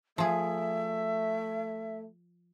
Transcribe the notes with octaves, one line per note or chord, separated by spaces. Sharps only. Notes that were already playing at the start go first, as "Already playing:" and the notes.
F3 A3 G#4 E5